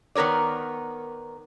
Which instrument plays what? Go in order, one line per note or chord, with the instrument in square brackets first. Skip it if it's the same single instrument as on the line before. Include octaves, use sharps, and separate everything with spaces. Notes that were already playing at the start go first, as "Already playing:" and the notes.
[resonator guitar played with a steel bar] D#3 B3 A#4 C#5 D5